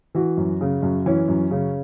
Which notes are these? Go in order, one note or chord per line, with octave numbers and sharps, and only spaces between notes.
E3 F#4
F#2
C#3
F#2
E3 C#4
F#2
C#3